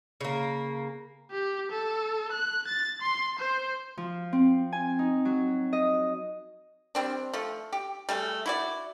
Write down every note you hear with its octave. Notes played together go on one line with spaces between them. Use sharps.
C#3 A#3
G4
A4
F#6
A6
C6
C5
F3
C4
G#5
D#4
F#3
D#5
G3 C4 D4
F3 A3
G4
G3 A3 G#4
E4 F#4 D5